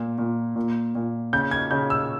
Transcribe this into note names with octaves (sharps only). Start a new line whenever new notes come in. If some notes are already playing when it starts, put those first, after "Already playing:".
Already playing: A#2
A#2
A#2
A#2
C#3 G6
G#6
C#3 G6
E6